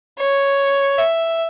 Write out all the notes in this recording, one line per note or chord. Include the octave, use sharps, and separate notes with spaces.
C#5
E5